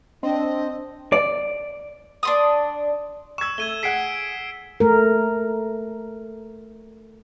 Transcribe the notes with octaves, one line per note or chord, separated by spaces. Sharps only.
C4 D4 D#5
D5
D4 C6 D#6
C#6 E6 G#6 E7
A3 G#6 D#7 G7
G#4 F#5 B6 C7 D7
A3 A#4